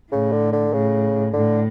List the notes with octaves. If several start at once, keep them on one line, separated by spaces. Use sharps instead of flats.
A2 C#3
D3
D3
A2 C#3
A2 D3